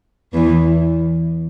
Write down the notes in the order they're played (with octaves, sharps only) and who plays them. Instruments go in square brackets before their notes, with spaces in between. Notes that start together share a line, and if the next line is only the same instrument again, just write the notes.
[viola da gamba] E2 E3